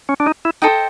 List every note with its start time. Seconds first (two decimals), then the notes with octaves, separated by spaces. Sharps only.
0.09 C#4
0.20 D4
0.26 D#4
0.45 E4
0.62 D#4 A4 C5 D#5 G5